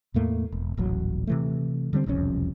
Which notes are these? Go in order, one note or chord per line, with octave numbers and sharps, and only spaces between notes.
E2 A2 A3 A#3
E1
D#1 A1 F#3
C3 E3 A3
D3 G3 A#3 C4
E1 C2 F2 C#4